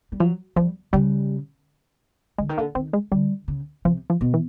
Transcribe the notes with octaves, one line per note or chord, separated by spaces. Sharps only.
G3
F3 F#3
F3 G3
C#3 G3
D3 G#3
D#3
D3 A#3
D#3 C4
G#3
D3 G3
C#3
C3 F3
F3
B2
E3